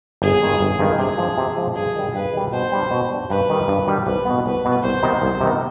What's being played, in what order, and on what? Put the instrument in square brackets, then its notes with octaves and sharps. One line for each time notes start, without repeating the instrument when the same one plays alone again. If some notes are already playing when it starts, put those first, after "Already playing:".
[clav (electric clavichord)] G1 [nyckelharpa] G#4
[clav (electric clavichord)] G2 D#3 G#3
G1
G2 D#3 G#3
[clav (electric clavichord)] C3 [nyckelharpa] G#4
[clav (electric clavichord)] F3 G#3
C3
F3 G#3
[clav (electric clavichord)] G2 [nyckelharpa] G#4
[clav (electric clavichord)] D#3 G3
[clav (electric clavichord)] G2 [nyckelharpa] B4
[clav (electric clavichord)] D#3 G3
[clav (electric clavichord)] B2 [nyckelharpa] C5
[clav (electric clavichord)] G3 D4
B2
G3 D4
[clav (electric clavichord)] G2 [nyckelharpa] B4
[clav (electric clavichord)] D#3 G3 D4
G2
D#3 G3 D4
[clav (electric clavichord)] C2 [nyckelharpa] B4
[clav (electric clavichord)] B2 B3
[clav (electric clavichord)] C2 [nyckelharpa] B4
[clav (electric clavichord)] B2 B3
[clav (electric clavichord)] C2 [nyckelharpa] C5
[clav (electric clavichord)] C3 D#3 B3 D#4
C2
C3 D#3 B3 D#4